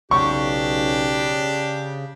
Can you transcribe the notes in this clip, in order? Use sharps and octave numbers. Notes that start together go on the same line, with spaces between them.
B1 C#3 D4 G4 C#6